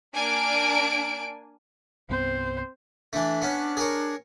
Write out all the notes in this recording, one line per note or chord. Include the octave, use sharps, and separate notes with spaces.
A#3 D4 G#5 D7
C2 G2 B3 C4 C5
E3 A3 D4
B3 C#4
G#4 A#4 C#5